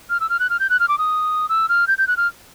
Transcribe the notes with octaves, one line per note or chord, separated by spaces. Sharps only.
F6
E6
F6
F#6
F6
G6
F#6
F6
D6
D#6
E6
F6
G6
G6
F#6
F6